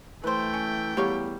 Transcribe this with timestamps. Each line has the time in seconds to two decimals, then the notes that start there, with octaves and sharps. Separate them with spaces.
0.24 E3 A3 B4 C5 G5
0.54 C#4
0.97 E2 F#3 G3 C#5 F5